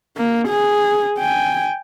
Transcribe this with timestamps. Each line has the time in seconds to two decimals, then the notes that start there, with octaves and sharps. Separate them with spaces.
0.17 A#3
0.48 G#4
1.20 G5 G#5